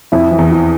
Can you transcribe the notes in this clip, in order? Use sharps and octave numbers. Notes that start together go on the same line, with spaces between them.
F2 E4
E3
E2
E3